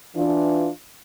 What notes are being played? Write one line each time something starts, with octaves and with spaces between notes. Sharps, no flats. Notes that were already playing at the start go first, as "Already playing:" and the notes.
E3 D4 F4